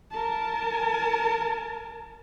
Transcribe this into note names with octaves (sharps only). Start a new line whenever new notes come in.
A#4 A5